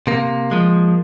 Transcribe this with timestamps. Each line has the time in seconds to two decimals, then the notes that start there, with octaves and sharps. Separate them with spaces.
0.07 C3 A#3
0.51 F3 G#3